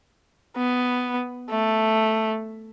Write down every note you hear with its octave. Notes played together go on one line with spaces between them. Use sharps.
B3
A3